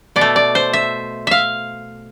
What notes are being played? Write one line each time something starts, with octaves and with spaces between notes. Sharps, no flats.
B2 D5
A3
D5
C5
E5
E5 F5